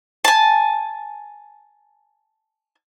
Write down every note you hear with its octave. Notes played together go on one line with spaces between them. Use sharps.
G#5 A5